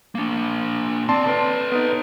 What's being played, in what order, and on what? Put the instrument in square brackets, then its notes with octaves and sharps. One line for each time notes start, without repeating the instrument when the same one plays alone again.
[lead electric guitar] A#3 D4
[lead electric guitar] D2 C4 [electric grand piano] D5 A5 C6
[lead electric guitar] A4 B4
[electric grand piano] B3 D#4